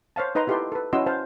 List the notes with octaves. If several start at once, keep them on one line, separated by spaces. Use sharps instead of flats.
C5 C#5 F5 A5
D#4 B4 D#5 A#5 C6
E4 F4 G4 A4 B4 C6
A4 B4
C#4 E4 F#4 D#5 C6 E6
C5 F5 A5